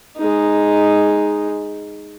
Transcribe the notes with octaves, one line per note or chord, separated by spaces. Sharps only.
G#3 D#4